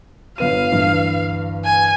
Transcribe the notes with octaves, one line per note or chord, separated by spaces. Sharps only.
G1 B3 F5 D#7
D2 G2 E3
G#5